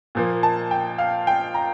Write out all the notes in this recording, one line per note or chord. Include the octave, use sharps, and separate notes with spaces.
A#2 F3 A#3
A5
G5
F5
G5
A#5